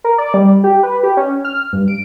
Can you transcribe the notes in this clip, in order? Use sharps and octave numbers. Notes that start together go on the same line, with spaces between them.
A#4
D5
G3
G4
B4
G4
C#4
F6
G2
D7